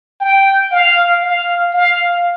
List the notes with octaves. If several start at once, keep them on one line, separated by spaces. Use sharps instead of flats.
G5
F5
F5
F5